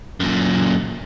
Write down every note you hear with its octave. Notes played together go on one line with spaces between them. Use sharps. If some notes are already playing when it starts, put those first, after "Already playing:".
F#2 A#2